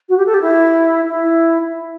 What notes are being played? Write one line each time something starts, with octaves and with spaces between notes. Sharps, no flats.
F#4
G4
A4
G4
E4
E4